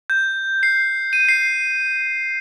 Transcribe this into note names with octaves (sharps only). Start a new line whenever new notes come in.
G6
C7
D#7
C7